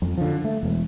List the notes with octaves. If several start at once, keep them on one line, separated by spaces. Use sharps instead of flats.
F2
D3 F3
A3
E1